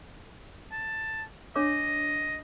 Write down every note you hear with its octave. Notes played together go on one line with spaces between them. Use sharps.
A5
D4 C#5 D#5 D6